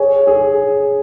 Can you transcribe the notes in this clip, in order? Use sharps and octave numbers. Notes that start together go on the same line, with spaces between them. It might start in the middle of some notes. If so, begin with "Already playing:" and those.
Already playing: G#4 C#5
G#4